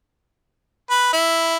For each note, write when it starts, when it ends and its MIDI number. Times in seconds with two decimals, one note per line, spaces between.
0.90 1.11 71
1.13 1.56 64